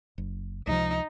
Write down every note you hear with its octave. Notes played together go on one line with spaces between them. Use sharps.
F#1
C#2 C3 F3 D#4